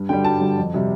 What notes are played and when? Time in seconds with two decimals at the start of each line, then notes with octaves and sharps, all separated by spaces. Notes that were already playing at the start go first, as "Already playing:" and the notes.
Already playing: G2
0.09 D3 G3 G5
0.25 G2 A5
0.41 D3 G3
0.58 F2
0.74 C3 G3